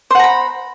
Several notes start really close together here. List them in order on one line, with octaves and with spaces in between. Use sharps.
C5 F#5 A#5 B5